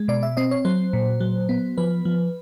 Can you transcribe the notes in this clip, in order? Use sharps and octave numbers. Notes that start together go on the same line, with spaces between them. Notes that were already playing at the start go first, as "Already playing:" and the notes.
Already playing: G#3
B2 D5
E5
C4 D#5
C#5
F#3 C5
A#2
F#3
B3
F3 B4
F3